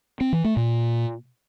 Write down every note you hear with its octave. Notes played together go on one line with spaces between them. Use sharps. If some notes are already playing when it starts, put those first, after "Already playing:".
C4
E3
A3
A#2